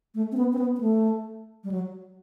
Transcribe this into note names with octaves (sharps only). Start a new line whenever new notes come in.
A3
C4
B3
C4
B3
B3
A3
G3
F#3